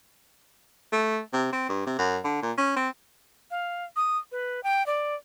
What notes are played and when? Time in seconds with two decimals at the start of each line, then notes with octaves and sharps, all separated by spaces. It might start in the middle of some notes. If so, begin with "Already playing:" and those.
0.92 A3
1.33 C3
1.53 C4
1.69 G2
1.86 C3
1.98 F#2
2.24 D3
2.43 A#2
2.58 C#4
2.76 C4
3.51 F5
3.96 D#6
4.32 B4
4.63 G5
4.86 D5